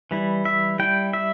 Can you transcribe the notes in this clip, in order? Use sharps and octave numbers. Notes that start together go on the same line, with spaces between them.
E3 G3 E4
E5
G3 E4 G5
E5